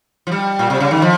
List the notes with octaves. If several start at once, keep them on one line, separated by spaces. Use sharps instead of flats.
F3
G3
A#2
C3
C#3
D#3
F3